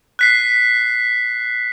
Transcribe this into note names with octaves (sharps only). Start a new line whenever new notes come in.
F#6 B6 C7